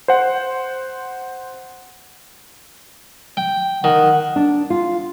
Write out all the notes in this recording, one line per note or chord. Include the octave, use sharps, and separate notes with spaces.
C5 F#5
G5
D#3 F#5
D4
F4